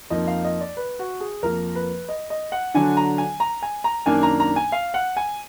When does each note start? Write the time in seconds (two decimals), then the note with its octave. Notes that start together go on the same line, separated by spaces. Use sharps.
0.10 F2 F3 A#3 D#4 D#5
0.27 F5
0.44 D#5
0.61 D5
0.77 B4
0.99 F#4
1.21 G#4
1.43 F2 F3 A#3 A#4
1.75 B4
2.09 D#5
2.30 D#5
2.52 F#5
2.74 D3 F#3 D4 G#5
2.97 A#5
3.18 G#5
3.40 A#5
3.62 G#5
3.84 A#5
4.06 F#2 D#3 A#3 D4 G#5
4.23 A#5
4.40 A#5
4.56 G#5
4.72 F5
4.94 F#5
5.17 G#5